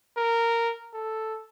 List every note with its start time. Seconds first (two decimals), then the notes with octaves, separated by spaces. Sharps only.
0.17 A#4
0.94 A4